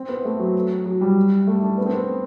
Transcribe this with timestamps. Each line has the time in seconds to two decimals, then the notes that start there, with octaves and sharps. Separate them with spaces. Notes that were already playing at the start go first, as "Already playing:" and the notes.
Already playing: C4
0.09 B3
0.25 A3
0.39 F#3
0.86 F#3
1.01 G3
1.47 A3
1.62 D4
1.78 B3
1.86 C4
1.95 B3